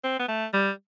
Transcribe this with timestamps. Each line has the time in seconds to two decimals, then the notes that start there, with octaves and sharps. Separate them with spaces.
0.04 C4
0.19 B3
0.29 A3
0.53 G3